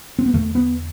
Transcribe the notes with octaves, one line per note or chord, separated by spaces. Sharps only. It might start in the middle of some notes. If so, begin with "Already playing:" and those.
C4
B3
E2 D3 A3
B3